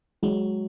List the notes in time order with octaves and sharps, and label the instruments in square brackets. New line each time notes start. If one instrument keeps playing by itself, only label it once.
[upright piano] F#3 [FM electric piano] G#3